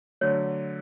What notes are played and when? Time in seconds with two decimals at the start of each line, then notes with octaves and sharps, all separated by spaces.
0.21 D3 F#3 A3 C#5